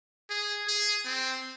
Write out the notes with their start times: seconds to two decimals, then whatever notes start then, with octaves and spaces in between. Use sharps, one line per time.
0.30 G#4
0.68 G#4
1.06 C4